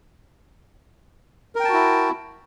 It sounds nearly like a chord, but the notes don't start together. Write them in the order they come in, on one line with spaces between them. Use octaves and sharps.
A#4 G5 A5 F#4 E4